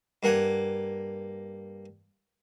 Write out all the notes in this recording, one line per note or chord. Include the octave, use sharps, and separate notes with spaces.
G2 A#3 F#5 G#5